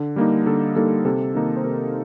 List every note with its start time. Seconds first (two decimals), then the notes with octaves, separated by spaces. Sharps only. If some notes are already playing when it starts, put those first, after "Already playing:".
Already playing: D3
0.16 G3 A#3 D#4
0.46 D3 A4
0.76 G3 A#3 D#4 A4
1.05 C3 A4
1.35 D#3 A#3 D#4
1.57 C5
1.64 C3 A#4